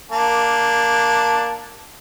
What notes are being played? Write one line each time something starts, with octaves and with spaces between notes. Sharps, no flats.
A#3 D4